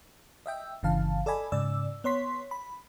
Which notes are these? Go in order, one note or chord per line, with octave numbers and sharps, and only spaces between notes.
D#5 E5 G5
G1 C#3 E3 F5 A5
A4 D5 D#5 G#5 B5
G#2 C#3 D5 E6
B3 C#5 C6 B6
B5